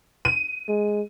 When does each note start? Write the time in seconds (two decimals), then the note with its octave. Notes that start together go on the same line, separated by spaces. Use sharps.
0.25 D#7
0.68 G#3